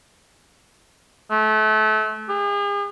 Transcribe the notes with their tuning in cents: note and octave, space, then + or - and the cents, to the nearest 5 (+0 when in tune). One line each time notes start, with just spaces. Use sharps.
A3 -30
G#4 -45